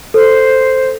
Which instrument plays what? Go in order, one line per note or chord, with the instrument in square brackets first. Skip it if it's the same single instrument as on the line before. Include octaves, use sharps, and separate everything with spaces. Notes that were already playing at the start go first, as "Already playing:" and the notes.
[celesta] A4 [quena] C5